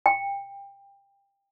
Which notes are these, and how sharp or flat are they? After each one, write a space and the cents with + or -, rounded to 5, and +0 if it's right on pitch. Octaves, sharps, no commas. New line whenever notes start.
G5 +25